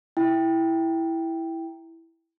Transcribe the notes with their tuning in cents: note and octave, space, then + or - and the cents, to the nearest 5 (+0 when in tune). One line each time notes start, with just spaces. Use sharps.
E4 +0 E5 +5 G5 +0